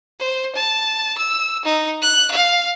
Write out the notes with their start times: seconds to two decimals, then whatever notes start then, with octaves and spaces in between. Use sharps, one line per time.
0.20 C5
0.55 A5
1.18 E6
1.65 D#4
2.02 F#6
2.31 F5